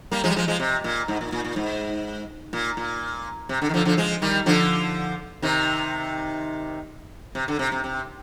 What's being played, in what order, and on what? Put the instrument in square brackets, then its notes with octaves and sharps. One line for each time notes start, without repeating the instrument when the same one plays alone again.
[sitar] G3 A#3
F3 G#3
G3
F3 G#3
F3 G#3
C3
A#2
G#2
A#2
A#2
A#2
G#2
A#2
A#2
C3
D3
D#3
D3 F3
D3 F3
F3 G#3
D#3 G3
D3 F3
C3 D#3
C3
D3
C3
C3
C3